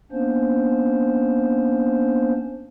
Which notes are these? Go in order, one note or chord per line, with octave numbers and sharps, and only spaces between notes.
A#3 B3 C#4 D4 C5